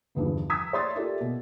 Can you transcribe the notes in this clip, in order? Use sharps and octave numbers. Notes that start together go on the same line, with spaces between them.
G1 E2 G2 F3
D#6 E6 G#6 B6
C#5 D5 C6 D#6 A6
F4 G4 A4 A#4 D5 E5
B2